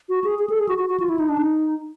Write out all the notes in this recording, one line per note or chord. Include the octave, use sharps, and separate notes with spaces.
F#4
G#4
G#4
A4
G#4
F#4
F#4
F#4
F4
E4
D#4
D4
D#4